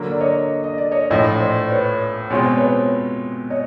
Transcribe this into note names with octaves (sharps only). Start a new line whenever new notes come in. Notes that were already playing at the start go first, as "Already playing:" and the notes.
Already playing: D3 F#3 A#3
D5
C#5 D#5
D#5
D5
C#5 D#5
A#1 A2 F3 C#5 D#5
C5 D5
B4 C#5
B2 G#3 C4 F4 C#5
C5
B4 C#5
C#5 D#5